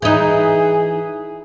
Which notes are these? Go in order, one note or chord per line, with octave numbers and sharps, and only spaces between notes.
E3 D#4 G#4